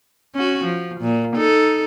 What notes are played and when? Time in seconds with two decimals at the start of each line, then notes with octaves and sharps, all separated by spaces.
0.35 C#4 F#4
0.64 F3
1.01 A#2
1.36 D#4 A4